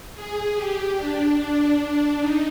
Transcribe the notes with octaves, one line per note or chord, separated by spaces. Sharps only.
G#4
G4
D4
D4
D4
D#4